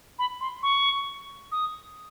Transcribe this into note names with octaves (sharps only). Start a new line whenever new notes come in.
B5
C6
C#6
D#6